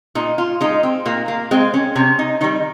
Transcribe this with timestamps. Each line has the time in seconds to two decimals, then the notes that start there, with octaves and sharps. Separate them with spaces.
0.15 A#2 D#4
0.38 F4
0.61 G#3 D#4
0.83 C4
1.06 A#2 A#3
1.28 A#3
1.51 G#3 C4
1.74 C#4
1.95 C3 C#4
2.19 D#4
2.41 D#3 G3 D#4